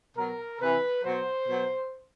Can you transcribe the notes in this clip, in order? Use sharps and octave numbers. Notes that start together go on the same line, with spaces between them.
B2 F#3 A#4
C3 E3 B4
B2 F#3 C5
B2 F#3